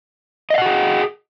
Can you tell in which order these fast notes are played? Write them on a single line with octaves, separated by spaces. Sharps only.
D#5 F5 F#5 F#4 G#4